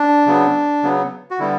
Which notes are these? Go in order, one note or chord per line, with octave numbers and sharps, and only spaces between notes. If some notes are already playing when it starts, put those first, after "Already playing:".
Already playing: D4
C#3 F#3 B3
C#3 F#3 B3
F#4
D3 G3 B3 E4